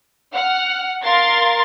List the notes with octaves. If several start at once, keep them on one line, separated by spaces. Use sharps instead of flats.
F#5 F6
A#4 F5 C6 A6 C7